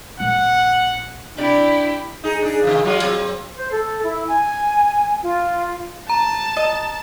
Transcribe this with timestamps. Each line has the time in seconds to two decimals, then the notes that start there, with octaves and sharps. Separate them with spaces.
0.20 A#1 F#5
1.38 C3 D4 E4 G4 D5
2.23 D#4 G#4
2.42 D4 G#4
2.63 C3 D#3 F3
2.84 F#3 G#3 F4
3.02 F#3 C4
3.57 C5
3.71 A4
4.03 E4
4.27 G#5
5.22 F4
6.09 A5 A#5
6.57 D#5